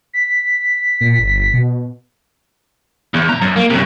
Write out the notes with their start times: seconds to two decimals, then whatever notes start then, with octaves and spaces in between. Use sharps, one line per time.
0.13 B6
1.01 A#2
1.19 G1
1.54 B2
3.14 E2
3.29 B2 A#5
3.42 F#2
3.56 A#3
3.70 F#2 C3